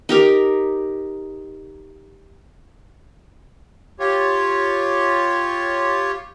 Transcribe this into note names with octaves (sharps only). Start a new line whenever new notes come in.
D#4 G4 A#4
F4 G4 C#5